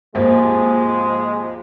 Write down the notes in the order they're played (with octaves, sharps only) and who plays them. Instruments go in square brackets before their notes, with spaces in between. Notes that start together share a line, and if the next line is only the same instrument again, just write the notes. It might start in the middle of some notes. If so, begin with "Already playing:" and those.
[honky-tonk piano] G#1 D#2 [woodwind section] F3 [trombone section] G#3